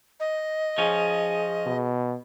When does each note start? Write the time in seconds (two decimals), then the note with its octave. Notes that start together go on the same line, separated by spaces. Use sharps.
0.20 D#5
0.78 F3 C#4 G#4
1.66 B2